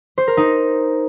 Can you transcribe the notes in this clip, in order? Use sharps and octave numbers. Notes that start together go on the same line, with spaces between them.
C5
A#4
D#4